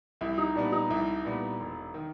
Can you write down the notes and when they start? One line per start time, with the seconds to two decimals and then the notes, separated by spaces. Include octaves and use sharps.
0.21 C2 E4
0.38 D#4
0.55 A#2 G3 B3 D4
0.72 D#4
0.90 C2 E4
1.25 A#2 G3 B3
1.60 E1
1.94 D#3